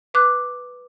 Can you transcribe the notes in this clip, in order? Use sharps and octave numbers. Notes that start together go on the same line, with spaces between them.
B4 D6 F#6